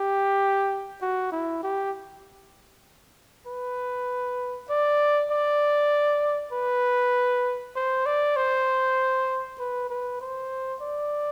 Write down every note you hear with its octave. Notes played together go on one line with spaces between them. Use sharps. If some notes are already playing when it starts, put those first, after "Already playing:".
Already playing: G4
F#4
E4
G4
B4
D5
D5
B4
C5
D5
C5
B4
B4
C5
D5